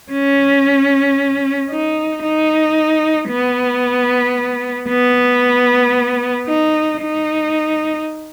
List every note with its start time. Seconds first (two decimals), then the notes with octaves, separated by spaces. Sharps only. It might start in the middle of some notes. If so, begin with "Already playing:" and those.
0.12 C#4
1.71 D#4
2.23 D#4
3.29 B3
4.89 B3
6.47 D#4
7.01 D#4